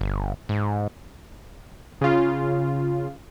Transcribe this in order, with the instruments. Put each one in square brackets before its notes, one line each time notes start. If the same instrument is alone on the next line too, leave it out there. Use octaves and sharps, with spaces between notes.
[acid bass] G1
G#2
[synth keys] C#3 F4